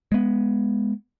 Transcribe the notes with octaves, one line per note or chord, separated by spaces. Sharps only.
G#3 B3